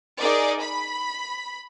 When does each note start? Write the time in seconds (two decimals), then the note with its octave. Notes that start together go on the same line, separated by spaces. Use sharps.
0.20 D#4 G#4 A#4 D5
0.61 B5